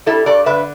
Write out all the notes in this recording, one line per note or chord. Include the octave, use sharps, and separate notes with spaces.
G3 E4 A4
G2 A4 D5
D3 B4 E5